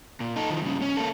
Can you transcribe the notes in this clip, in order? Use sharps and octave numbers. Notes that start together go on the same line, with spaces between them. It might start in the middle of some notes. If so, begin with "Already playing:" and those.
A#2
D#4 A4
D#3 F3
G2 C#3
C#4
A#3 A4